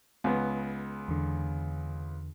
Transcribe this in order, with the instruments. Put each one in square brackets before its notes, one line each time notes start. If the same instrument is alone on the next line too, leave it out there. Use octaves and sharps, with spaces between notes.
[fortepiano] C#2 B3
[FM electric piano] E2 D3